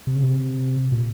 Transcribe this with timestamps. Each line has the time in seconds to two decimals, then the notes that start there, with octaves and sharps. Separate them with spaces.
0.07 C3
0.16 C#3
0.23 C3
0.92 A#2